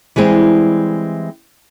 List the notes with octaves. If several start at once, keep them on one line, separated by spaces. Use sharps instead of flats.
E3 G3 G#3 C4